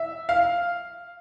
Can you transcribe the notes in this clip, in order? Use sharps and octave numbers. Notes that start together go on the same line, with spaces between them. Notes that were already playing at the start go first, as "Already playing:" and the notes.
Already playing: E5
F5